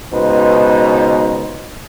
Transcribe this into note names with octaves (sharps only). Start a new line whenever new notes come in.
C#2 B2 D#4 B4 C5